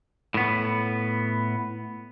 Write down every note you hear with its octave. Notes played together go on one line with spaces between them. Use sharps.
A2 B3